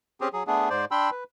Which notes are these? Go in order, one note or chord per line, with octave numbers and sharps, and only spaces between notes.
C4 C#4 G4 G#4
F#3 G#4
A3 B3 D4 G#4
G#2 C5 D5
D4 G5 B5 C6 E6
B4